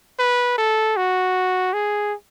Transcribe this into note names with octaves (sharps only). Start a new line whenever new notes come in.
B4
A4
F#4
G#4